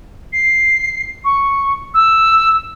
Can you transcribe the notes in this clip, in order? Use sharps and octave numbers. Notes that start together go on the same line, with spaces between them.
C7
C#6
E6